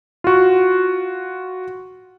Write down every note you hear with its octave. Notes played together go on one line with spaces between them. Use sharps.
F4 F#4